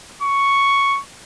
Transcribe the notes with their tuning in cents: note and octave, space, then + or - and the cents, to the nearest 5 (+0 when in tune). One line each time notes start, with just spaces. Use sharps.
C#6 +0